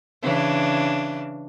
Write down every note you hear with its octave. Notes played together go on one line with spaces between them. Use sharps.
C#3 E3 D4